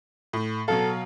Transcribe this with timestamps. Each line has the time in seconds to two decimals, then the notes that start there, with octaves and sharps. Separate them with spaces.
0.33 A2
0.68 B2 F#3 A4 F5